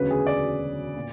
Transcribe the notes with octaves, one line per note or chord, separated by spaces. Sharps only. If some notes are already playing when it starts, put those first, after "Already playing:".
Already playing: E1 D2 C#3 F#3 B4
G#4
D5
A#2